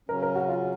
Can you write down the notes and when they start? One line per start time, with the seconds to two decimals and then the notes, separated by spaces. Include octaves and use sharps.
0.09 C#3 F#3 C#4 A#4
0.22 A#4
0.35 F#4
0.48 F4